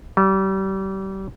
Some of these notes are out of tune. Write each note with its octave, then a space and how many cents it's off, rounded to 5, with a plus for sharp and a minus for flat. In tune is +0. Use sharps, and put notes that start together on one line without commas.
G3 -30